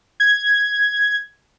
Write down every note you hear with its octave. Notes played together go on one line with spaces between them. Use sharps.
G#6